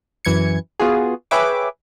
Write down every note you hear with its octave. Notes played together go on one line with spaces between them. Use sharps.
F#2 E3 G#6 C#7
B3 F4 F#4 G#4
G#4 B4 C#5 E5 G5 D6